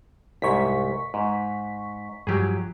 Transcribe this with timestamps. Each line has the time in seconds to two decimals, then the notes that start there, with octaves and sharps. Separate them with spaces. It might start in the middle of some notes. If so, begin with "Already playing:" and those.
0.42 C2 G#2 C#6 B6
1.14 G#2
2.27 G2 F3 F#3 G4 G#4